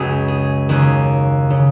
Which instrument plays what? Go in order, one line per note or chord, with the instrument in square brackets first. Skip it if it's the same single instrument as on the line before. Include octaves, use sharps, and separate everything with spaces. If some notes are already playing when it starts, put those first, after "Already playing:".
Already playing: [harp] C#2 F#2 C#3 F#4 G#4
G#4
D#2 C#3 G#4
C#3